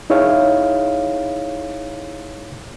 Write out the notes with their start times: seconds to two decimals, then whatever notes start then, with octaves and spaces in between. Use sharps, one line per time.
0.10 D#4 E4 G#4 C#5 F5